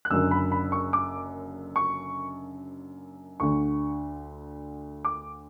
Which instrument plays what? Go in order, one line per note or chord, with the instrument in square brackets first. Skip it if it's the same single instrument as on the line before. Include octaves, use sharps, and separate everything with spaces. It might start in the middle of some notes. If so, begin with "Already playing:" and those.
[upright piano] F#6
F#1 F#2 D3 E6
B5
B5
C#6
D6
C#6
D2 D3 C#6
D6